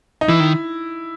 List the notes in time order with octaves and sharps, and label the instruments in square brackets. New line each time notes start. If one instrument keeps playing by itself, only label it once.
[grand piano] D#4
[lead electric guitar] E3 [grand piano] E4
[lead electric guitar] D#3